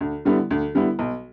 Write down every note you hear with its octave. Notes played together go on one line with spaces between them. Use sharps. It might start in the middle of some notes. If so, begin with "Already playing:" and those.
D2
D3 G3 B3 E4
D2
D3 G3 B3 E4
B1